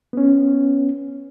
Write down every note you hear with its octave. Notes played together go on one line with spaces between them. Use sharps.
B3 C#4